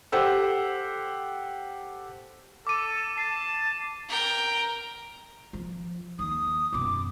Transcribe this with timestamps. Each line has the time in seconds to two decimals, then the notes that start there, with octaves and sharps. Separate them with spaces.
0.12 G4 A4 C5 F#5 E6
2.67 A4 D6 D#7
3.18 A5 C7
4.09 A#4 G5
5.53 F3
6.19 D#2 D#6
6.72 F#2 B2 D6